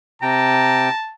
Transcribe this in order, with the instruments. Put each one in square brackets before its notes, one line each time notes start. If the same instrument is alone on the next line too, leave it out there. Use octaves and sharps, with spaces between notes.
[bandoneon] C3 G5 [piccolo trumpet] A5 [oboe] A#5